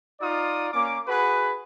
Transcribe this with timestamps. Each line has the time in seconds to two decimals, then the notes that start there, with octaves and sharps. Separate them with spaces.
0.20 D#4 F4 D5 D#6
0.73 A#3 C#4 D6
1.07 F#4 G#4 B4